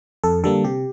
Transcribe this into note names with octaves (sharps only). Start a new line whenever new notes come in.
F2 A4
D3 G3 A#3 A4
C3 G4